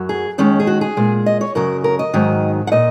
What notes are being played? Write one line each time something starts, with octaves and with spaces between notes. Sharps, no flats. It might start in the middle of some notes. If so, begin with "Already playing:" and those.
Already playing: F#2 F#3
G#4
D#2 D#3 G#3 C#4
G#4
F#4
G#4
A#2 G#3
D#5
C#5
F#2 C#3 F#3 A#4
A#4
D#5
G#2 D#3 F#3
F#5
A#2 D#5